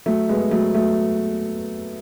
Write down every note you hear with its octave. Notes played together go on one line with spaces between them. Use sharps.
F#3 A3
G#3 B3
F#3 A3
F#3 A3